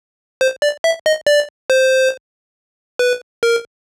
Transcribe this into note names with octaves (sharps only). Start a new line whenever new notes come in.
C5
D5
E5
D#5
D5
C5
B4
A#4